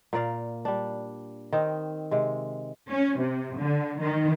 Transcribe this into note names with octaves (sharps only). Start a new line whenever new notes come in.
A#2 A#4 D5 F5
G3 D4
D#3 C4 D#5
C3 G#3
C#4
C3
D3
D#3